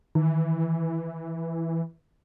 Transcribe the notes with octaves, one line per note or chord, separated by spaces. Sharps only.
D#3 E3